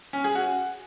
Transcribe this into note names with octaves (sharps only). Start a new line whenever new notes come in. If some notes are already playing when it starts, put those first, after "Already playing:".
C#4
G#4
F#4